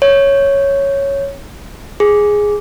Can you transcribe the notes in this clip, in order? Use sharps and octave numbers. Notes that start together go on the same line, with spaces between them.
C#5
G#4